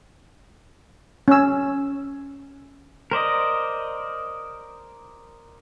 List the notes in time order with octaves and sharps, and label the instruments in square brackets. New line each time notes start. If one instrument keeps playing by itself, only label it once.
[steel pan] C#4 E6
[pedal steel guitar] A#4 C5 D5 D#5